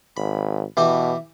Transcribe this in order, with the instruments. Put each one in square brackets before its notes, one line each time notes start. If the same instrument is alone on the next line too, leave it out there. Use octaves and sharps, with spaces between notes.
[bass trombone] G#1 [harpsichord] B5
[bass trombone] B2 [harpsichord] E3 E4 G4